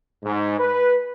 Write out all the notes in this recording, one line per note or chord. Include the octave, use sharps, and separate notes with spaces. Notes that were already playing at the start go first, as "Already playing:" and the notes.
G#2
B4